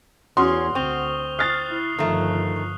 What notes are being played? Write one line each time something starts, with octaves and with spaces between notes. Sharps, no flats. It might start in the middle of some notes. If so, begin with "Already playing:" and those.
E2 C#4 F#4 C6 D#6 F6
D2 C4 C#6 F7 G7
D#6 F6 F#6 A6 C7
E4
G1 D#3 F3 A3